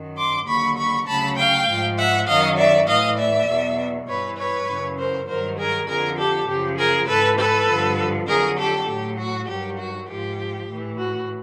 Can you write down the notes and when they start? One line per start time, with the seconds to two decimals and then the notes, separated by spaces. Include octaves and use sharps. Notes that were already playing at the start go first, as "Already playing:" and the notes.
Already playing: F#2 D#3 F#3
0.17 C6 D6
0.47 D#2 D3 F#3 B5 C#6
0.77 B5 C#6
1.07 D2 C#3 F#3 A5 B5
1.37 F5 G5
1.68 G#2 F3
1.97 E5 F#5
2.27 F#2 D#3 F#3 D#5 F5
2.57 D5 E5
2.87 A2 E3 D#5 F5
3.18 D5 E5
3.48 E2 B2 F#3
4.07 G2 E3 B4 C#5
4.37 B4 C#5
4.67 F#2 C#3 E3
4.98 A#4 C5
5.27 G2 D#3 F#3 A#4 C5
5.57 G#4 A#4
5.87 F2 D3 F3 G#4 A#4
6.17 G4 A4
6.47 F#2 C#3 F3 G4
6.77 G#4 A#4
7.07 G#2 E3 A4 B4
7.38 A4 B4
7.67 G2 D3 F3
8.27 F2 D3 F#3 G#4 A#4
8.58 G4 A4
8.87 A2 F#3 G4
9.18 F#4
9.47 G2 D#3 F#3 G4
9.79 F#4
10.08 G#2 F3 G4
10.68 A2 E3
10.98 F#4